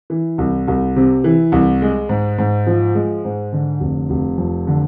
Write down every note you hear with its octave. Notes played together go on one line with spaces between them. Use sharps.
E3
C2
C2
C3
E3
C2
G#3
G#2
G#2
F3
G#3
G#2
D3
F1
F1
F2
D3